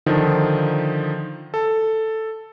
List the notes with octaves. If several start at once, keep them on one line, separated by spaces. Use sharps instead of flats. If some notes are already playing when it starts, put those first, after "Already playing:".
D3 D#3 F3 D#4
A4